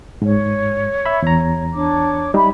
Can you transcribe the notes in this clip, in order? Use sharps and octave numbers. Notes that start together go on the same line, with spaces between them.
G#2 C#5
E5 B5
E2 A#5
D4 C#5 D6
G3 D#4 E5 B5